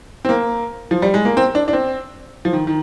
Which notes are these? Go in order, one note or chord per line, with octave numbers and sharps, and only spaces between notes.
C4
A#3
F3
G3
G#3
A#3
C4
D4
D4
C4
F3
D#3
D#3